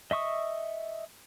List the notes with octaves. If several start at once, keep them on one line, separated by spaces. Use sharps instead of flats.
D#5 E5 C#6 D#6